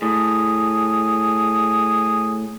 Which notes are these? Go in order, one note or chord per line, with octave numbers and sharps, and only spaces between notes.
A2 G#4